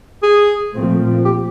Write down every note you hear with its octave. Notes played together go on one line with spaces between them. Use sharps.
G#4
A#2 F3 A3 C4
G4